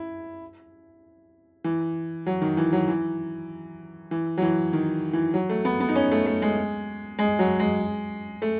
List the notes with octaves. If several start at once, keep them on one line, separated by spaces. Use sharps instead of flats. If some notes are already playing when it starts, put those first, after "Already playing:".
Already playing: E4
E3
F#3
D#3
E3
F#3
E3
E3
F#3
E3
D#3
E3
F#3
A3
B3
B3
D#4
C#4
A3
A3
G#3
G#3
F#3
G#3
A3